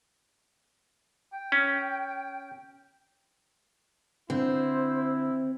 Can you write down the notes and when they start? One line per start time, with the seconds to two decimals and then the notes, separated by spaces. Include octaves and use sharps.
1.33 G5
1.52 C#4
4.30 D3 C4 E4 C5